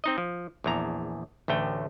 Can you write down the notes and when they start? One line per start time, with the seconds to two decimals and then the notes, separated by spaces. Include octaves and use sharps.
0.04 C4 D#4 D#5
0.18 F3
0.64 A#1 E2 A#5
1.48 A1 D2 A3 G5